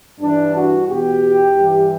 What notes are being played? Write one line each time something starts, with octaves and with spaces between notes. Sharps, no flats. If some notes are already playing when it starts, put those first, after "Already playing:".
G2 E3 D4
F#4
E2 B2 G4
G2 E3